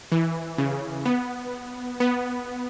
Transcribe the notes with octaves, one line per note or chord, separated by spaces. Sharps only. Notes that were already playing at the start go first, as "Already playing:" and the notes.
E3
C#3
B3
B3